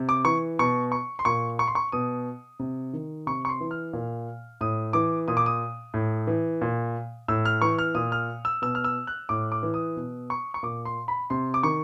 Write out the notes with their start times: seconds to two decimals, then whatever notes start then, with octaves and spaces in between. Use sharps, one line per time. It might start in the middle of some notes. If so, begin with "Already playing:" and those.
Already playing: C3
0.09 D6
0.25 E3 C#6
0.59 B2 C#6
0.92 C#6
1.19 C6
1.25 A#2 C#6
1.59 C#6
1.68 C6
1.75 C#6
1.92 B2 D#6
2.59 C3
2.93 D#3
3.27 C3 C#6
3.45 C#6
3.49 C6
3.61 E3
3.71 F6
3.93 A#2
4.61 A2 D#6
4.93 E3 D6
5.28 A#2 D#6
5.37 D6
5.46 D#6
5.94 A2
6.27 E3
6.61 A#2
7.28 A2 E6
7.45 F6
7.62 E3 C#6
7.79 F6
7.95 A#2 D#6
8.12 F6
8.45 E6
8.62 B2 E6
8.75 F6
8.84 E6
9.07 F#6
9.29 A2 D6
9.52 D6
9.63 E3
9.74 D#6
9.97 B2
10.30 C#6
10.54 C#6
10.63 A#2 D6
10.85 C6
11.08 B5
11.30 C3 C6
11.54 D6
11.63 D#3 C#6